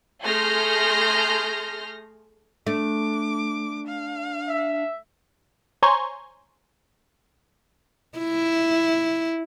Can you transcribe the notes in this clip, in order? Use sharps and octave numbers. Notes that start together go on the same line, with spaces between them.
A3 G#4 C6 F6 G6 A#6
A3 D4 D6
F5
E5
C5 C#5 G#5 A#5 C6 C#6
E4